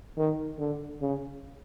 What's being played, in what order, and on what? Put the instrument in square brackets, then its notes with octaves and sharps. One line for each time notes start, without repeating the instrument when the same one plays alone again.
[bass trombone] D#3
D3
C#3